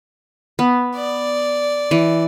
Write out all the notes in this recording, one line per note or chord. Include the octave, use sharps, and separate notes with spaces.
B3
D5
E3